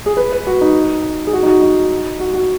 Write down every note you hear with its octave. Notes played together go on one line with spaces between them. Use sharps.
G#4
B4
B4
F#4
D#4
G#4
F#4
D#4
F#4
D#4
F#4
F#4